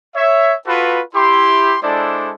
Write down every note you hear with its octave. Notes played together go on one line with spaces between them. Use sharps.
C#5 E5
F4 F#4 A4 B4
E4 G4 C6
G#3 D4 E4 A4 C5 D5